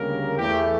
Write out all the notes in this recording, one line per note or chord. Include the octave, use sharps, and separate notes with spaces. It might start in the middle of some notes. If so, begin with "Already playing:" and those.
Already playing: D2 C#3 G3 A#3 A#4
E2 E3 A3 G4